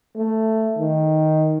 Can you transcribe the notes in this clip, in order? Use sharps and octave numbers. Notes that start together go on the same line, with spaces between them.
A3
D#3